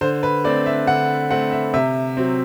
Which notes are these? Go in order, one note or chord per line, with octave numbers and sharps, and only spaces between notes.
D3 C5
B4
A3 C4 D5
E5
D3 F#5
A3 C4 F#5
E5
C3 E5
F#3 C4